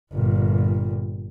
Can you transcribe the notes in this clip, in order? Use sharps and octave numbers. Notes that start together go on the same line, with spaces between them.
G1 A#2